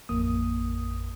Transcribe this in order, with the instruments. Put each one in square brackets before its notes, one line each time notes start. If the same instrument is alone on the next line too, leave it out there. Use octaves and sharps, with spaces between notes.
[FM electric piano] A1 F2 A#3 D#6